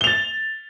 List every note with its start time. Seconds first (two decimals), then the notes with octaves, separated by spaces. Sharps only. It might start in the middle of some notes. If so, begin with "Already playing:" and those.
0.01 G7
0.04 F7
0.07 A6